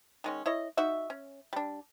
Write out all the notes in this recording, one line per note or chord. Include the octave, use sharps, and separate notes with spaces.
D#3 G#3 C#4
E4 C#5 D#5
D#4 F#4 E5
C#4
G3 D4